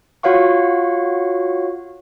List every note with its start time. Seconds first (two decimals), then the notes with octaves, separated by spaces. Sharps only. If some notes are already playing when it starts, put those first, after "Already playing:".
0.23 F4 F#4 C#5 F5 F#5 C#6